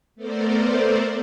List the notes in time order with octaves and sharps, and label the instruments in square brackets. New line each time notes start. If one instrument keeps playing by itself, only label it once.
[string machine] A3 B3 A4 A#4 C5 D5